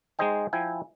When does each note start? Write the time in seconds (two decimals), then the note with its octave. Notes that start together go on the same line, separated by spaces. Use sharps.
0.19 G#3 D#4 G#4 C5 D#5 G5
0.53 F3 E4 G5 G#5